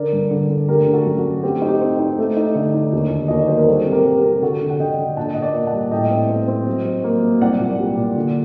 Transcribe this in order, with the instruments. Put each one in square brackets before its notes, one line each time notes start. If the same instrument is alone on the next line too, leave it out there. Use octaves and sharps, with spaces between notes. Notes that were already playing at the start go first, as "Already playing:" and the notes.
Already playing: [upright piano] D3 A#4 D5
G2
D3
D3
A3 G4 A#4
D3
F#4 A4
F#2
F#4
A3
C4 G4
F#4
D#4
G4
C4
D#4
A3
D#4
D3
D#4
D#2
D#2
D#2 D#5
D5
F#3 C5
A#4
G3 F#4 A4
C3
G4 A#4
G3
G4 A#4
C3
G4
D3 F#4 A4
D3
F#5
D3 D#5 G5
D3
A#2 F#5 A5
A#2 D#5
D5 F#5
A#3
F#5 A5
G3
A2 D#5 G5
C4
C4
C4
F#3
F#3
A#3
F#3
C2 D5 F#5
A#2
G3
A#2
D3